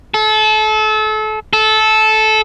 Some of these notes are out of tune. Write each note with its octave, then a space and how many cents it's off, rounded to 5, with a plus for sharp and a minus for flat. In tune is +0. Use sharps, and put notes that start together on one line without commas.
A4 -30
A4 -15